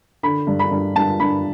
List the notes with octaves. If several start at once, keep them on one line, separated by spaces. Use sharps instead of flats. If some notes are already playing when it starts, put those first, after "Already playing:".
D3 B5
G2
B5
G2
G2 A5
G2 B5